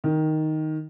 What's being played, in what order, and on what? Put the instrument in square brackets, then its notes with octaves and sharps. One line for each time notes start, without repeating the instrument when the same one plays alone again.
[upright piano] D#3